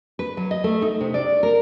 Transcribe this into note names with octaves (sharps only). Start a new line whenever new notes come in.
B4
F#3
D#5
A3
D#4
C3
D5
A#4